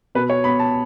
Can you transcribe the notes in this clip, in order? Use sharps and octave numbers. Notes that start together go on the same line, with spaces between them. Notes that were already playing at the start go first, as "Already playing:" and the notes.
B2 B4
C#5
B3 B5
A5